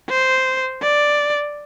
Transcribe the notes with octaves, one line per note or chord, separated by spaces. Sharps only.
C5
D5